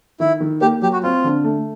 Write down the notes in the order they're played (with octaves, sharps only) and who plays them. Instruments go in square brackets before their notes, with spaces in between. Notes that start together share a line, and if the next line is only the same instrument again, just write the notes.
[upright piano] D#3 [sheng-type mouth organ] E4
[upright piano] D#3
[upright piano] A#3 [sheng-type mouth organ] G4
[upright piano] F#3 [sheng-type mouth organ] G4
[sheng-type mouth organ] F#4
[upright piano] C4 [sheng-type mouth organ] F4
[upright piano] D3
A3